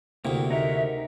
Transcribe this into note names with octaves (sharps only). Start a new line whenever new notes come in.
D2 C3 A#3 E4
D#4 F#4 A#4 E5